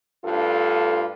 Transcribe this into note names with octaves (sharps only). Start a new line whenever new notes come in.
D2 G2 F4 A4